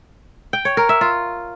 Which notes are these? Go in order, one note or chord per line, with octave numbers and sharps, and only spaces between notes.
G5
C#5
A#4
E5
F4